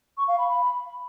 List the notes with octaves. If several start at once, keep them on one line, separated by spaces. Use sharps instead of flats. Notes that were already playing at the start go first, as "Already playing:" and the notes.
C#6
F5
B5
B5